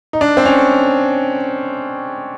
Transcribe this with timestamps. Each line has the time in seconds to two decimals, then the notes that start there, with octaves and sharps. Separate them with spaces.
0.13 D#4
0.21 D4
0.37 C4
0.45 C#4